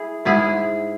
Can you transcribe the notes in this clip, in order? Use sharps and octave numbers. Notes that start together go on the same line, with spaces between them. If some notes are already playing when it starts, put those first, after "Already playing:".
Already playing: E4 G#4
G#2 G#3 E4 G#4